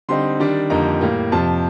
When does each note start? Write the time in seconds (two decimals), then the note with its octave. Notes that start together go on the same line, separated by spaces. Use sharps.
0.09 D3 G3 C4 D#4 C6
0.40 D#3 G3 D4
0.70 F2 D3 G3 A#3 D#4 A#5
1.01 A2 G3 A#3
1.32 F2 C3 F3 A5